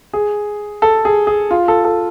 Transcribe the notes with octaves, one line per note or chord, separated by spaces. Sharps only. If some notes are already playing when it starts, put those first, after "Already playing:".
G#4
A4
G#4
G#4
F4
A4
A4